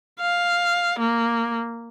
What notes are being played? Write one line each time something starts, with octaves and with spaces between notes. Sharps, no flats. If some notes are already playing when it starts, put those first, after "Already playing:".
F5
A#3